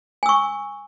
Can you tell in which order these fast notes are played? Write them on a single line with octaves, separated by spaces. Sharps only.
G#5 E6 C#6